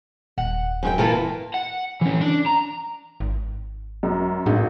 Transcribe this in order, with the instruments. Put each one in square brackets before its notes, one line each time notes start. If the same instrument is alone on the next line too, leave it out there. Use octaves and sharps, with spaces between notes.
[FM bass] D#1 [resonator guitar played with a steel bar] F#5
[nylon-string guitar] F#2 F#4 G5
[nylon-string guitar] A#2 E3 A#3 [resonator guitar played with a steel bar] F4 A4 A#4
[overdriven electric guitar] F#5
E3 C#4
D4 D5
A#5
[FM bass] G#1
[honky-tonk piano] F#2
[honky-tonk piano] G#1 [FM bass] A2